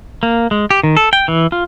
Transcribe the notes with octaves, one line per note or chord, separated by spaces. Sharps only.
A#3
G#3
G4
D#3
A4
G5
E3
F4